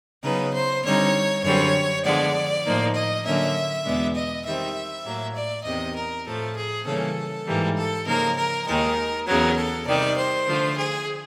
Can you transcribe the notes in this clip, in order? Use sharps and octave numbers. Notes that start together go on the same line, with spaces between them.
C#3 F#3 B3 D#4 B4
C5
D3 G3 C4 D#4 C#5
F#2 D3 G3 C4 C#5
D3 F3 G#3 B3 D5
A2 F3 A#3 D#4
D#5
D3 F#3 A#3 C#4 E5
E2 B2 G#3 B3 D4
D#5
D#3 G3 C4 E5
A2 F#3 A#3
D5
E2 C3 D#3 D#5
A#4
A2 F3 A3 A4
G#4
C#3 E3 G3 A#3 C#4 A4
G#2 E3 G3 A#3
A4
C#3 F3 A#3 D#4 A#4
A#4
D#2 D#3 G#3 A#4
E2 C#3 F#3 A#4
A4
C3 D#3 G3 D5
C5
D3 F3 A3
G#4